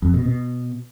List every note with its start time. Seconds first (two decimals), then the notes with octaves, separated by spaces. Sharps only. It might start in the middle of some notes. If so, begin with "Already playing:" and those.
0.02 F2
0.14 B2
0.26 B2